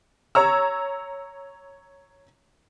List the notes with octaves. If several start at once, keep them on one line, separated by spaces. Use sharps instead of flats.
C#5 A#5 E6